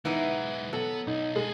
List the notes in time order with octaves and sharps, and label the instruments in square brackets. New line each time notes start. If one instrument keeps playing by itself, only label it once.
[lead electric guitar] B1 G#3 [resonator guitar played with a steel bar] E3 B3 D#4
[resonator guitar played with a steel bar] F#3 [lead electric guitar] B3 [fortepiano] A4
[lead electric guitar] B1 [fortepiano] D#4
[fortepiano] G#3 [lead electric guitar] G#4 A4